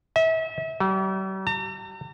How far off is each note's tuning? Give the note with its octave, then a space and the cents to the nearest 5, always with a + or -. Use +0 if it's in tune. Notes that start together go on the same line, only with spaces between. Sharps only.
E5 -35
G3 -45
A#5 -45